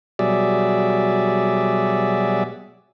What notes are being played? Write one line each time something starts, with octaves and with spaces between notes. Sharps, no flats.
B2 F#3 G3 G#4 D5 E5